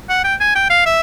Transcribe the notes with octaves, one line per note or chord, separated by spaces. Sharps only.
F#5
G5
G#5
G5
F5
E5